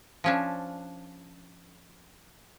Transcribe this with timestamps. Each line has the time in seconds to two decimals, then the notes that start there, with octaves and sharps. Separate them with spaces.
0.24 F3 C#4 D4